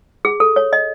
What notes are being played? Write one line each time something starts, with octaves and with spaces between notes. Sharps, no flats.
G#4
A4
C#5
D#5